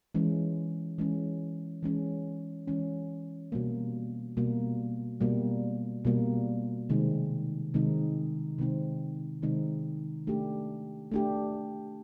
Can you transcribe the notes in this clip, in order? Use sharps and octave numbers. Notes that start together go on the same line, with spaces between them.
E3 G#3 C#4
E3 G#3 C#4
E3 G#3 C#4
E3 G#3 C#4
B2 G3 A#3
B2 G3 A#3
B2 G3 A#3
B2 G3 A#3
C3 D#3 G#3 C4 D#4
C3 D#3 G#3 C4 D#4
C3 D#3 G#3 C4 D#4
C3 D#3 G#3 C4 D#4
A3 D4 G4
A3 D4 G4